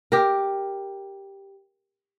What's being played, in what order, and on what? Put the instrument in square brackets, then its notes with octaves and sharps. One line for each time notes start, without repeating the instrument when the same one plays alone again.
[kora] G4 A#4